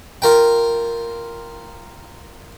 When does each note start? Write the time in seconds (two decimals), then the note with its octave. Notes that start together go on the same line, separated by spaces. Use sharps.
0.22 F4 A#4 G5